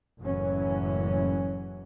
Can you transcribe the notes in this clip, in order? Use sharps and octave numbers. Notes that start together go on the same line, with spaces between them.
F#1 F#2 A2 E3 F#3 C#4